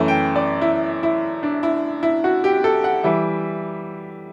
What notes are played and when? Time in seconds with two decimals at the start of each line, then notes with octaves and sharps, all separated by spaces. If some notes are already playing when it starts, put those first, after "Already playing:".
Already playing: F#2 E3 A3
0.08 G5
0.36 D5
0.62 E4
1.03 E4
1.43 D4
1.63 E4
2.03 E4
2.24 F#4
2.44 G4
2.64 A4
2.84 F#5
3.04 E3 G3 E5